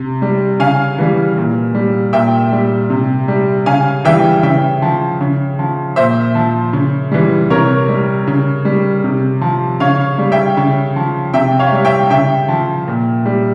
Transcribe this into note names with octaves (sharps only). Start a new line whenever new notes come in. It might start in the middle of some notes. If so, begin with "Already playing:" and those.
Already playing: C3
G3
C#3 F5 G#5
E3 G3
A#2
G3
A#2 E5 G5
G3
C3
G3
C#3 F5 G#5
E3 G3 E5 G5
C#3 E5 G5
F3
C#3
F3
A#2 C5 E5
F3
C#3
E3 G3
C3 A#4 C#5
G3
C#3
G3
C3
F3
C#3 C#5 F5
G3
E5 G5
C#3
F3
C3 E5 G5
C#5 F5
G3
E5 G5
C#3 E5 G5
F3
A#2
G3